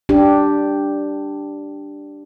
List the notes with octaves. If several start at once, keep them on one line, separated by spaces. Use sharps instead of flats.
D4 G4